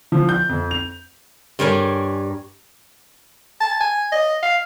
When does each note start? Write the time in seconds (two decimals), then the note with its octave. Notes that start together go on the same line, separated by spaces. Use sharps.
0.12 F3
0.29 G6
0.49 F2
0.71 F7
1.59 G2 G3 A#4 C#5 G#5
3.61 A5
3.81 G#5
4.12 D#5
4.43 F5